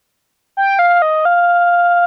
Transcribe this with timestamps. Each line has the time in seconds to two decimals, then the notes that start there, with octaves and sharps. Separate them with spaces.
0.57 G5
0.79 F5
1.02 D#5
1.25 F5